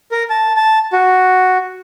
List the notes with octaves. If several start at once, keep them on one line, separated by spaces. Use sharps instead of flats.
A#4
A5
A5
F#4